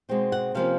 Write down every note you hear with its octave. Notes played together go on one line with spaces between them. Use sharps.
B2 G#3 C4 D#4
F#5
C3 F3 A#3 C#4 F5